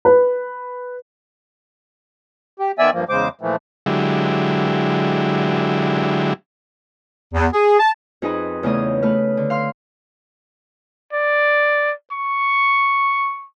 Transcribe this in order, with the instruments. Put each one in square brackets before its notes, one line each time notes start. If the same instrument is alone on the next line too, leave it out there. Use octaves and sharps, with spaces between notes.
[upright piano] B4
[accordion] G4
D#3 B3 D5 E5 G#5 E6
G2 F3 A#3
E2 C#3 G#3 C5 D6
A#2 E3 F3 A3
[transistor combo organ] D3 F#3 G#3 E4 G4
[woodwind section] E2
G#4
A5
[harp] F2 D#4 G#4 B4 D#5
E2 C#3 A3 C#4 D#5 D#6
A3 B4 F6
D3
F5 C6 F6
[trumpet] D5
C#6